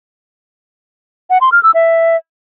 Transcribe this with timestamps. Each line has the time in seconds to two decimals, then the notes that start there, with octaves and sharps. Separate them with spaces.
1.30 F#5
1.41 C6
1.52 F6
1.63 E6
1.74 E5